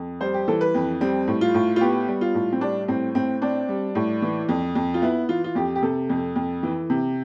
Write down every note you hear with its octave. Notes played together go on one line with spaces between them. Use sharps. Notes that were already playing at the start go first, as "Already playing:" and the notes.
Already playing: F2
G3 C5
G4
E3 A4
B4
F2
G3 C4
A2
F4
A2
F4
B3 G4
G3
F4
A2
C4
G3 D4
A2 C4
A2 C4
C4 D4
G3
A2
E3
F2
F2
F4
B3 E4
E3 F4
F4
F2 G4
G4
C3 A4
F2
F2
E3
C3